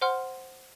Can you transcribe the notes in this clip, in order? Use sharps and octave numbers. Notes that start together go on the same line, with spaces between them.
C5 F#5 C6 F6